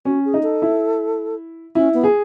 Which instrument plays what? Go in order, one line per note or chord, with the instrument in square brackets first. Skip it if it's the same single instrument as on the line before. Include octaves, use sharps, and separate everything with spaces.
[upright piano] C#4 [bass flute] F#4
[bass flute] G#4
[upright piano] D#4
[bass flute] A4
[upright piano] E4
[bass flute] C#4 [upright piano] E4
[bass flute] B3
[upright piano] G#4